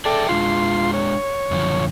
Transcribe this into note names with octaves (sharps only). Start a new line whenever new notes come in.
G#4 A4 D5 E5 G5
G#3 D4 F4 G#4 C6
C#5
F#2 D3 F3